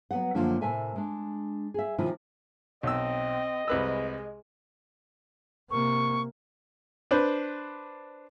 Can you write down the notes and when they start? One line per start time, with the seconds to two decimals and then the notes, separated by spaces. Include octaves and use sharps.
0.11 F#3 B3 F#5
0.35 F#2 D3 F3 A3 A#3 D4
0.61 A2 C3 A#4 E5 G#5 A5
0.96 G#3 D4
1.74 G#4 E5
1.98 C3 D#3 F3 C#4 E4 F4
2.83 B1 C4 D#5 E6
3.68 C2 G#3 B4 E6
5.71 C3 A#3 C#6
7.11 D4 B4 C5